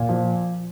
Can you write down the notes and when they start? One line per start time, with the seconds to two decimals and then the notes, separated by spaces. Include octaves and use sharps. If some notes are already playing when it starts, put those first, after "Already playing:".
Already playing: A#2
0.09 F3